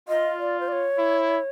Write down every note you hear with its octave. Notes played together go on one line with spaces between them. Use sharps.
F4 D#5
D5
C5
D5
C#5
E4